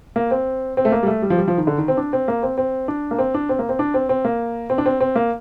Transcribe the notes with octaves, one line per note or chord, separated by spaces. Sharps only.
A#3
C4
C4
A3
A#3
G3
A3
G3
F3
G3
F3
D#3
D3
D#3
C4
D4
C4
A#3
C4
C4
D4
A#3
C4
D4
C4
A#3
C4
D4
C4
C4
A#3
C4
D4
C4
C4
A#3